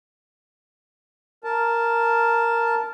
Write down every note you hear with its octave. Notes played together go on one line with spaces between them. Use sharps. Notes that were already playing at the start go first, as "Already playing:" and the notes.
A#4 A5